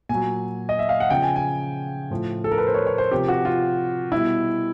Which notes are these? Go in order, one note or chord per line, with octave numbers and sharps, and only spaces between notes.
A#2 G#5
F#3
D#5
E5
F5
F#5
C#3 F3 G5
G#5
G#5
A2 F3
A4
A#4
B4
C5
C#5
C#5
C5
C3 F3 G4
F#4
F4
B2 G3 E4